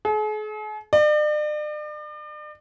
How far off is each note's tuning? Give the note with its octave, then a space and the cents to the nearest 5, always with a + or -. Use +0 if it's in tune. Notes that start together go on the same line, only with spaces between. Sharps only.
G#4 +45
D5 +40